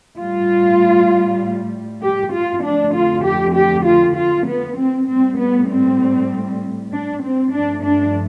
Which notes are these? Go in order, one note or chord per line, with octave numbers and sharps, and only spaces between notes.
A2 G3 F4
G4
F4
F2 D3 A3 D4
F4
G4
G4
F4
F4
B3
C4
A2 G3 C4
B3
C4
D4
C4
G2 F3 A3 D4
D4